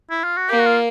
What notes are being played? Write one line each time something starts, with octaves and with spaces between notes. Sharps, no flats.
E4
F4
F#4
A#3 G4
F#4
F4